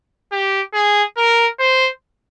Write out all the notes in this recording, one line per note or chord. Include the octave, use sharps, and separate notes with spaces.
G4
G#4
A#4
C5